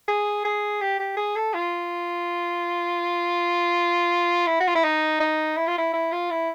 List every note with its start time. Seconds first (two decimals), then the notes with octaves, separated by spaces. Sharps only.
0.08 G#4
0.45 G#4
0.81 G4
0.99 G4
1.17 G#4
1.36 A4
1.54 F4
4.47 E4
4.60 F#4
4.67 F4
4.75 E4
4.84 D#4
5.20 D#4
5.57 E4
5.67 F4
5.78 E4
5.93 E4
6.12 F4
6.30 E4